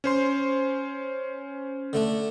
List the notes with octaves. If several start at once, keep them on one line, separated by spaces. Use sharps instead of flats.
C#4 C5 C6
D3 A3 D4